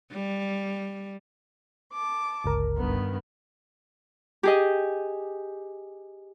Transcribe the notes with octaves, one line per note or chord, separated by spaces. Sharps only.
G3
A5 D6
G1 C#2 A#4
G2 D#3 B3
G4 G#4 D#5